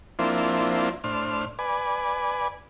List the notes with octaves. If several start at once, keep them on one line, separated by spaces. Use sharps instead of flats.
F3 A#3 C4 D4 E4 F4
A2 D4 C5 F6
B4 D5 G#5